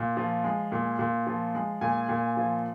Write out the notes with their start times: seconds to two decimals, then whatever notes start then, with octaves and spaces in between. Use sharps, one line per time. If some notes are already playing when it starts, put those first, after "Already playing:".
Already playing: A#2
0.17 F3
0.44 G#3
0.72 A#2
0.99 A#2
1.27 F3
1.55 G#3
1.81 A#2 G#5
2.09 A#2
2.37 F3